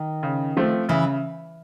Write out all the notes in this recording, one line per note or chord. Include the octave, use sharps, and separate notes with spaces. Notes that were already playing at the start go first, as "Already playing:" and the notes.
Already playing: D#3
C#3
F3 A3 C4
C#3 E3